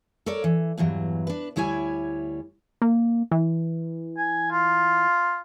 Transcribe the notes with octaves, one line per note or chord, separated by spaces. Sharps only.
A4 A#4 C#5 D5
E3
E2 G2 E3 F#3
D4 B4
D2 G3 E4 C#5 G#5
A#3
E3
G#5
F4